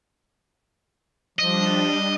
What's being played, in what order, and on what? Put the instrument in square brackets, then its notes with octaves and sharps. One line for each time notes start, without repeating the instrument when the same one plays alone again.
[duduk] F3 [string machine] G3 D4 [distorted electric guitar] D#5